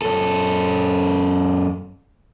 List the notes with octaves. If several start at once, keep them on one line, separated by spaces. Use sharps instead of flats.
F#2 A4